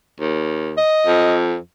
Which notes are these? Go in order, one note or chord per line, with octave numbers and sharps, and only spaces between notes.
D#2
D#5
F2